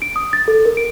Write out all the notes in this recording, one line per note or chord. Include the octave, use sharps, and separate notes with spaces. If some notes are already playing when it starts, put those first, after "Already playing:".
D7
D#6
A6
A4
A#4
D7